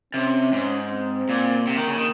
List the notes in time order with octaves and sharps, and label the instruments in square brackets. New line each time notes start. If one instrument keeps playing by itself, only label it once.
[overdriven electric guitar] C3 [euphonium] C#4
[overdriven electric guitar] G#2
[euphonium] C4
[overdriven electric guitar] A#2
[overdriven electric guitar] C3 [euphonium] A#3
[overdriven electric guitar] D#3
C#3
D#3